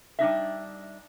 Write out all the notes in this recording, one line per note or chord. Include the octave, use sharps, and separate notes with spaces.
G3 D4 D#4 E5